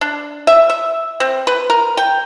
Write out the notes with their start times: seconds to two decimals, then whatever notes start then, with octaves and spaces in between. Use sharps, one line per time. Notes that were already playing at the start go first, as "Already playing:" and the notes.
0.01 D4
0.47 E5
0.70 E5
1.20 C4
1.47 B4
1.70 A#4
1.97 G5